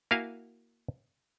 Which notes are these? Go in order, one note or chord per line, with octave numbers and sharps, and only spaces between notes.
A#3 E4 F#4 A#4 F5 G#5